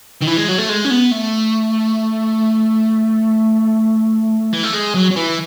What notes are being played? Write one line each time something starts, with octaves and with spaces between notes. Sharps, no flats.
D#3
E3
G#3
F#3
A3
G#3
C#4
B3
A3
E3
A3
G#3
F#3
F#3
E3